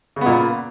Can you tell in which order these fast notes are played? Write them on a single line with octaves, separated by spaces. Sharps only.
C#3 B3 A#2